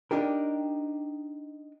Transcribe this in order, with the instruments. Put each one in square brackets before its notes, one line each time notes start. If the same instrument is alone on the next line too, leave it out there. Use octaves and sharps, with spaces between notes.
[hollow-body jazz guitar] D4 D#4 G4 A#4